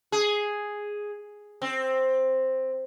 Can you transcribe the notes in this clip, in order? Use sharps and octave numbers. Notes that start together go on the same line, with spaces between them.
G#4
C4